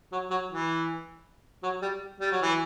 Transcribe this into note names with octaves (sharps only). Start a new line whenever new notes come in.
F#3
F#3
E3
F#3
G3
G3
F#3
E3